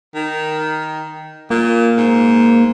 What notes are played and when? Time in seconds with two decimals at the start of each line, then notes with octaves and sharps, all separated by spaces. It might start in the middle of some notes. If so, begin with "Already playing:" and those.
0.15 D#3
1.50 A#2 A#3
1.97 G#2